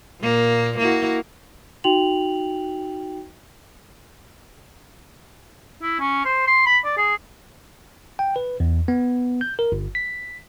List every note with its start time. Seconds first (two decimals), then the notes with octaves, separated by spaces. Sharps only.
0.21 A#2 A#3
0.79 A#3 E4 F#4
1.84 D#4 F#4 G5 F7 F#7
5.82 E4
6.00 C#4
6.25 C5
6.47 C6
6.66 B5
6.84 D5
6.97 G#4
8.19 G5
8.36 B4
8.60 E2
8.88 B3
9.41 G6
9.59 A#4
9.72 G1
9.95 B6